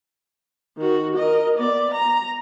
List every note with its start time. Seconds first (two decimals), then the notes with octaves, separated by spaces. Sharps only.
0.78 D#3 F#4
1.16 A#4 D#5
1.58 B3 D5
1.94 A#5